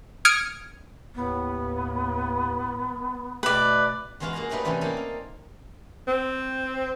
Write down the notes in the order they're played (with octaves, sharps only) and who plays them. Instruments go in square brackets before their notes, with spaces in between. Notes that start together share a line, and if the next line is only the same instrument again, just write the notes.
[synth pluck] D#6 F6 G#6 C#7 D7
[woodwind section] D#2 A2 [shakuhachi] B3
[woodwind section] B2 A3 [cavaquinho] B4 D5
[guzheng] E2 E3 G#3 F4 F#4 F5
A#3 F#4 G#4 A#4 A#5
F#3 G3 A3 D#4 B4 D5
C3 E3 G3 C4 C#4
A#3 D#4 A4 D5
F5
[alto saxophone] C4